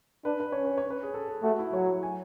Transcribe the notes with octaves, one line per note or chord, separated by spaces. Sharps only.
D4 B4
B4
C#4 C#5
B4
C#5
B4
G#4
A4
G#4
A3 F#4
E4
F#3 C#5
G#5